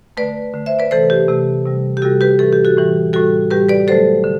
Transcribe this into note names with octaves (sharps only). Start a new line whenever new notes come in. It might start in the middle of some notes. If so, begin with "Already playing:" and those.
D3 A3 B4 D5
D3 A3
C5 E5
B4 D5
C3 E3 A3 A4 C5
G4
C3 E3 A3
C3 G3
G4
C3 G3 F#4 A4
G4 B4
A2 E3 G3 A4
G4
F#4 A4
A2 E3 G3
A2 G3 F#4 A4
A2 G3 G4 B4
B4 D5
D3 F#3 A3 A4 C5
D3